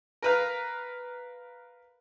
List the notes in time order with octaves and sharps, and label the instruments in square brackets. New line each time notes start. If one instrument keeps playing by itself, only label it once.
[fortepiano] A#4 B4 F5